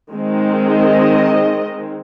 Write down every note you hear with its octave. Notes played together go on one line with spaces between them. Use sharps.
D#3 G#3 C4
D#5